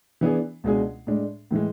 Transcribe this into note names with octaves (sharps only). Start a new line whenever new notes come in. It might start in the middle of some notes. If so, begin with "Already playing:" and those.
E3 B3 D4 G#4
C#2 B2 G#3 D4 G#4
A2 G#3 D4
A2 E3 G#3